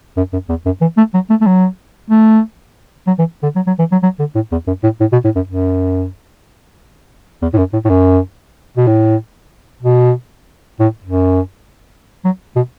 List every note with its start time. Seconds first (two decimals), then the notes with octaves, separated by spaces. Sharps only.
0.17 F#2
0.33 F#2
0.49 E2
0.66 F#2
0.81 E3
0.98 A3
1.14 F#3
1.30 A3
1.41 A3
1.46 F#3
2.10 A3
3.07 F#3
3.19 E3
3.43 D3
3.56 F#3
3.67 F#3
3.79 E3
3.92 F#3
4.03 F#3
4.19 D3
4.35 A2
4.52 E2
4.67 F#2
4.84 A2
5.00 A2
5.12 B2
5.24 A2
5.36 F#2
5.48 F#2
7.42 E2
7.53 A2
7.58 F#2
7.73 A2
7.85 A2
7.90 F#2
8.77 B2
8.87 A2
9.83 B2
10.80 A2
11.04 F#2
12.25 F#3
12.56 B2